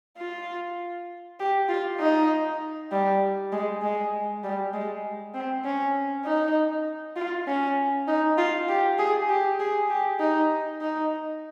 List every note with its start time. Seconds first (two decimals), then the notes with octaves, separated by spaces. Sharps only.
0.18 F4
1.40 G4
1.69 F4
2.00 D#4
2.91 G3
3.52 G#3
3.82 G#3
4.44 G3
4.73 G#3
5.34 C4
5.65 C#4
6.25 D#4
7.16 F4
7.48 C#4
8.08 D#4
8.38 F4
8.69 G4
8.98 G#4
9.29 G4
9.60 G#4
9.90 G4
10.20 D#4
10.81 D#4